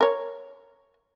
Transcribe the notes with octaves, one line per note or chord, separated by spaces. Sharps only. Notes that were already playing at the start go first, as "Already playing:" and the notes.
A#4 C#5